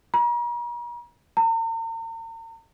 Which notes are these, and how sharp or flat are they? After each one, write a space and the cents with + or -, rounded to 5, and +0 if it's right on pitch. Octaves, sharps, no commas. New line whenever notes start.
A#5 +40
A#5 -45